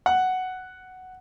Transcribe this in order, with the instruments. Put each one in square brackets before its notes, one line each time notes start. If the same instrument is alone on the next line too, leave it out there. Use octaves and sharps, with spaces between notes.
[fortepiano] F#5